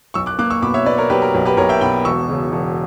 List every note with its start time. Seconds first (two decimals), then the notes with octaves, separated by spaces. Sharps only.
0.14 B1 C#6 E6
0.26 D6 F#6
0.39 A#3 D6 F#6
0.50 C#6 E6
0.62 B2 B5 D6
0.74 C#5 E5
0.86 A#3 B4 D5
0.98 A#4 C#5
1.10 F#3 G4 B4
1.22 A#4
1.34 B1
1.45 G4 B4
1.57 B1 A#4 C#5
1.69 E5 G5
1.81 B2 G5 B5
2.05 E1 C#6 E6
2.29 C#3
2.52 E1